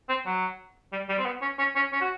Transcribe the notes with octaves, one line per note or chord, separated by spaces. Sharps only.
C4
F#3
G3
G3
C4
B3
C#4
C#4
C#4
C#4
F#4